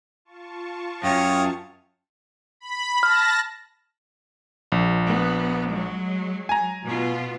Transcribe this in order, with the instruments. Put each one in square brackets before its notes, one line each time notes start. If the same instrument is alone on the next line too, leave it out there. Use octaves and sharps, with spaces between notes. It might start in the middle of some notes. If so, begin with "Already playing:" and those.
[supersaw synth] F4 A5 C#6
[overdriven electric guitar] F#2 [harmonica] C#5 F5 D#6 [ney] G5
[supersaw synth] B5
[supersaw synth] A5 A#6 [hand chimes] F6
[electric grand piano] A#1
[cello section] B3
F#3 G#3
[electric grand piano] G#5 A#5
[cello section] B2 B3 F4